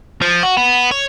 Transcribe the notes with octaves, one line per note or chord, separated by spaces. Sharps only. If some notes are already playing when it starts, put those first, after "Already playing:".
F3
F#4
B3
C#5